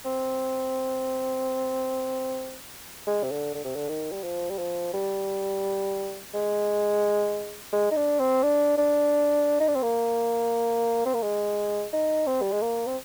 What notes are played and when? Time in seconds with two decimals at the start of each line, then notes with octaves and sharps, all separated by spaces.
0.05 C4
3.07 G#3
3.23 C3
3.31 D3
3.55 D3
3.65 C3
3.76 D3
3.89 D#3
4.12 G3
4.24 F3
4.50 G3
4.58 F3
4.94 G3
6.34 G#3
7.73 G#3
7.91 D#4
7.96 D4
8.20 C4
8.43 D4
8.78 D4
9.60 D#4
9.68 D4
9.75 C4
9.83 A#3
11.05 C4
11.14 A#3
11.22 G#3
11.93 D#4
12.27 C4
12.42 G3
12.52 G#3
12.62 A#3
12.87 C4